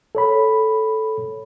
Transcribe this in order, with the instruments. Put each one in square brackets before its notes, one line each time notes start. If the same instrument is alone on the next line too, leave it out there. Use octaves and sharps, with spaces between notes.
[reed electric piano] A4 C#5 B5